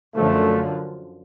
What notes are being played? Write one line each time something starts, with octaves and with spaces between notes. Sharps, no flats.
F#2 D3 F3 A3